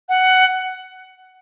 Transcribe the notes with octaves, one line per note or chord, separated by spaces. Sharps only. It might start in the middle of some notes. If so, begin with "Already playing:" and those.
F#5